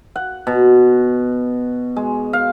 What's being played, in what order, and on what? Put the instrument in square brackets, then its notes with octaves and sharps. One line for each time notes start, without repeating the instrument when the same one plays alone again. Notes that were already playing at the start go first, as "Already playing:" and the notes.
[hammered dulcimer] F#5
B2
G#3
F5